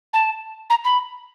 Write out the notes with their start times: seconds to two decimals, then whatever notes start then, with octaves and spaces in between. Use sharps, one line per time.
0.13 A5
0.70 A#5
0.85 B5